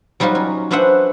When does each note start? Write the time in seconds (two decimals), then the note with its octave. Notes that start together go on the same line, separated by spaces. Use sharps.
0.20 F#3 G3 D#4 F4 F#4
0.35 C#4
0.71 C#4 D4 B4 C5 E5 F#5